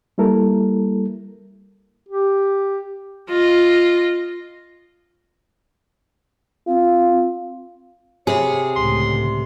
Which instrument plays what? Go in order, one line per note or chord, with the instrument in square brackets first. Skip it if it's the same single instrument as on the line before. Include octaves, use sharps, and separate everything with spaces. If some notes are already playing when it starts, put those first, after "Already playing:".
[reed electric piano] G3 A#3 E4 A4 A#4
[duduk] G4
[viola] F4 D#5
[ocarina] C4 [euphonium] F4
[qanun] C3 B5 [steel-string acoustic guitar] G#4 [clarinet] C#5
[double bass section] C#2 A2 D3 [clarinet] C6